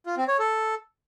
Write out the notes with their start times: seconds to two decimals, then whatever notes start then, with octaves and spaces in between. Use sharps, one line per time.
0.06 F4
0.17 C4
0.28 C#5
0.39 A4